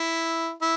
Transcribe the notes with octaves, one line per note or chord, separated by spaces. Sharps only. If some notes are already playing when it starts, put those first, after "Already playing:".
Already playing: E4
E4